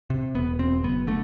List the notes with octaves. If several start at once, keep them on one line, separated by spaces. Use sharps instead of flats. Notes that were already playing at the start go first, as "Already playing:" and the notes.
C3
E1 B3
E1 C4
F#1 B3
D3 A3